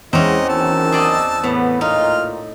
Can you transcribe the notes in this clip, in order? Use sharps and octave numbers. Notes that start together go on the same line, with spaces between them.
E2 G#3 C4 C#4 E4 D#5
F#1 F#2 D#3 A5 E6
G#4 D5 D#5
A2 B3
A#2 D#4 F4 F6